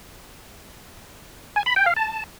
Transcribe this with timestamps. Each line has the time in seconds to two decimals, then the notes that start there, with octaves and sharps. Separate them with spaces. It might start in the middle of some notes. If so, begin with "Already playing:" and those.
1.56 G#5
1.66 B5
1.76 G5
1.86 F5
1.96 A5